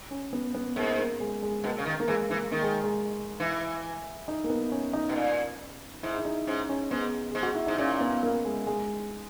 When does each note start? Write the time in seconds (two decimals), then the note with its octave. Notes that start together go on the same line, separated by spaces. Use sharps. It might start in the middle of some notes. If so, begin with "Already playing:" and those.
0.11 C#4
0.33 B3
0.55 B3
0.76 G#2 A#3
0.99 A#3
1.20 G#3
1.42 G#3
1.64 B2 A#3
1.78 C#3
1.86 D#3
2.00 A#3
2.08 E3 G#3
2.30 E3 A#3
2.52 D#3 A#3
2.62 G#3
2.84 G#3
3.40 E3 E4
4.28 D#4
4.44 A#3
4.50 B3
4.72 C#4
4.93 D#4
5.09 B2
5.16 A#2
6.03 G#2 E4
6.18 E4
6.25 D#4
6.47 G#2 C#4
6.69 C#4
6.91 G#2 B3
7.31 G#2 G#4
7.43 F#4
7.55 E4
7.66 G#2 D#4
7.78 A#2 C#4
8.01 B3
8.23 A#3
8.45 G#3
8.67 G#3